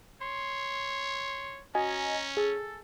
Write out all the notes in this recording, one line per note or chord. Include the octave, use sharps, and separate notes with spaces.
C#5 C6
C#4 F#4 D#5 G#5 A#5
G#4 A4